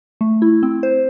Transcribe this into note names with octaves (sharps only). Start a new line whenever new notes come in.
A3
E4
C4
C5